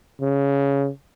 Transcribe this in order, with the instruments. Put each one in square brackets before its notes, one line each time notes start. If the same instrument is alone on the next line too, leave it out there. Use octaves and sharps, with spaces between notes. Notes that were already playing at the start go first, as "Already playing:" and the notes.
[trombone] C#3